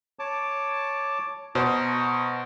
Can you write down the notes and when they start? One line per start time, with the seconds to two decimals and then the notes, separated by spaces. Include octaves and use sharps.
0.19 C#5 A5 D6
1.55 B2 C5 A#5 C#6